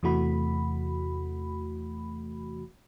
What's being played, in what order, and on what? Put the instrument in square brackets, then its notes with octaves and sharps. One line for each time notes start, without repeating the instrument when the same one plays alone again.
[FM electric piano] E2 C3 E3 A3 F#4 B5